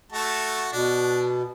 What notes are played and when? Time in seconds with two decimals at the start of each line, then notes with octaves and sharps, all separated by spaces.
0.12 A3 F#4 A5
0.73 B2 D4